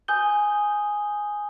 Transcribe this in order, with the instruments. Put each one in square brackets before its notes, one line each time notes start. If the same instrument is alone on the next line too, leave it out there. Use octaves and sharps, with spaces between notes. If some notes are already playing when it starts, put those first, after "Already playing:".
[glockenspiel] G#5 D#6 G6 G7